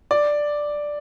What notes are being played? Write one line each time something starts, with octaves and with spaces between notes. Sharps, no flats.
D5